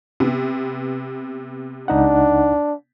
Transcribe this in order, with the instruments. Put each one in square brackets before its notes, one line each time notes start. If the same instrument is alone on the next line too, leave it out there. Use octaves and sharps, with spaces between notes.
[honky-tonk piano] C3 B3
[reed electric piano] C#2 D#4 F#5 [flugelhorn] D4